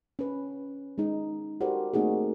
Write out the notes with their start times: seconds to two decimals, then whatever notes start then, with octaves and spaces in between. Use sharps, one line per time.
0.19 C#4 B4
0.98 G#3 D#4
1.61 F#4 G4 A4 A#4 C5 D5
1.93 A3 A#3 C4 D#4 F#4 G#4